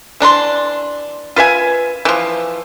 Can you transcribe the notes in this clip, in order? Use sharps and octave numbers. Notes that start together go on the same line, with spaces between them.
E3 D4 A#5 C6
F4 B4 E5 G#5
E3 F3